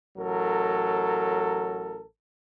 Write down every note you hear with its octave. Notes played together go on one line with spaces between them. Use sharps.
A1 F#3 A4 A#4